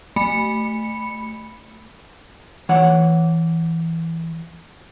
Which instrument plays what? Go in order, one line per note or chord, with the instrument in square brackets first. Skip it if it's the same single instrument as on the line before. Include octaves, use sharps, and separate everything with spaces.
[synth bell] A3 B5 C#7
[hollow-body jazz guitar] E3 C#5 F#5